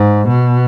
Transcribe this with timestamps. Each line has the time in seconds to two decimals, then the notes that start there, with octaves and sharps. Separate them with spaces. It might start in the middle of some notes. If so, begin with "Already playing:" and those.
Already playing: G#2
0.28 B2